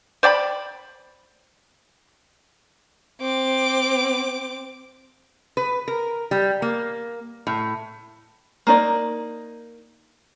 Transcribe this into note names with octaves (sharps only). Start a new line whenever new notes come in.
C5 D5 G5 B5
C4 D6
B4
A#4
G3
A#3
A2
A#3 D#4 D5